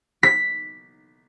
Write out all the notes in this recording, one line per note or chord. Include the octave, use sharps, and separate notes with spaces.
B6